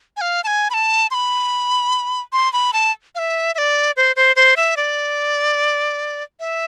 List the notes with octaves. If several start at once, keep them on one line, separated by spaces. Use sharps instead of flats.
G#5
F5
A5
G#5
B5
A5
C6
B5
C6
B5
A5
F5
E5
E5
D5
C5
C5
C5
E5
D5
E5